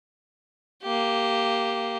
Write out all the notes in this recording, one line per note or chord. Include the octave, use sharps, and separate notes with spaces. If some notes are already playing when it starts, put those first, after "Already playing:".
A#3 G4